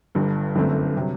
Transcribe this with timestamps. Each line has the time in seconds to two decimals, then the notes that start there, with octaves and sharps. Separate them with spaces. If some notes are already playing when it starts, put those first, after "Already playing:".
0.15 G1 G2 D3
0.55 G1 F#2 D3 A3 C4
0.96 C3 F#3